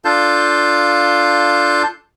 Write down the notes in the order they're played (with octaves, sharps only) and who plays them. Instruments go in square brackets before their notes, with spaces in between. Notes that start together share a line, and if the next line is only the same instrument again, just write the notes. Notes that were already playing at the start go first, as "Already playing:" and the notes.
[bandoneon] D4 F4 A4 F5 A5 G6